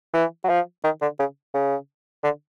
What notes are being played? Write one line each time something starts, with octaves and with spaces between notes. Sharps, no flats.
E3
F#3
F3
D#3
D3
C#3
C#3
D3